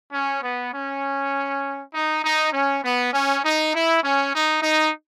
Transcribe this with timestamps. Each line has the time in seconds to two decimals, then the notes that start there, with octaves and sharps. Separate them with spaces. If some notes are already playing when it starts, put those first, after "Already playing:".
0.13 C#4
0.42 B3
0.72 C#4
1.94 D#4
2.24 D#4
2.53 C#4
2.83 B3
3.13 C#4
3.43 D#4
3.73 E4
4.03 C#4
4.33 D#4
4.63 D#4